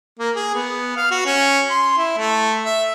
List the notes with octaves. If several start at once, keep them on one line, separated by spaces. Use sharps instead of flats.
A#3
G#4
B3
F5
F#4
C#4
C6
E4
A3
E5